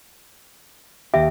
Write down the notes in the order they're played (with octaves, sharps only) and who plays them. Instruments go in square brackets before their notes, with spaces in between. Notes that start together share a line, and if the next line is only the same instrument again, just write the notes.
[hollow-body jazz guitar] D#2 G4 [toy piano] E5